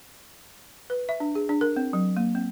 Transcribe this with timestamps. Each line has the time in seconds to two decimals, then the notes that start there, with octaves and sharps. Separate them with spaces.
0.90 B4
1.09 E5
1.20 D4
1.35 G#4
1.49 D4
1.61 A#4
1.76 C4
1.93 F#3
2.17 A#3
2.35 C4